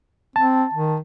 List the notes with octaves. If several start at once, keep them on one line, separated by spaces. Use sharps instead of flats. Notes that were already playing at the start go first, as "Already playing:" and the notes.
C4 A5
D#3